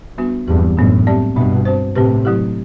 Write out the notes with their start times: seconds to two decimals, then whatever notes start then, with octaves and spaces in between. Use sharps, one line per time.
0.18 G3 B3 D4 F#4 B4
0.48 E2 G2 F#3 C4 G4
0.77 F#2 A2 F#3 B3 D4 F#4
1.07 G3 C4 G4 D5
1.36 G2 B2 G3 B3 D4
1.65 C4 F#4 C5
1.95 A2 C3 C4 G4 B4
2.25 F#3 A3 E4 G4